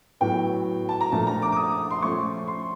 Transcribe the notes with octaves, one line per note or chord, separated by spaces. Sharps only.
A2 F#3 B3 G5
A5
A#5
A#2 F3 A3 D4 A5
A#5
D6
D6
D#6
C6
F3 A3 C#4 C#6
C6